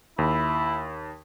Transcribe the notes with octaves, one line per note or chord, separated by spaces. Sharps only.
D#2 E4